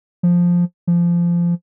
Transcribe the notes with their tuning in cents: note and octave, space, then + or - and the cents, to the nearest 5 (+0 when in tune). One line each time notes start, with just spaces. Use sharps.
F3 +5
F3 -20